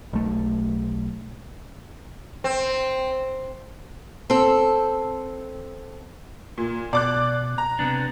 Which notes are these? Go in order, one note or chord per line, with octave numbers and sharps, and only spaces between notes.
B1 A3
C4
C4 A4
A#2
B2 D5 D6 F#6
A#5
C3 B3 D4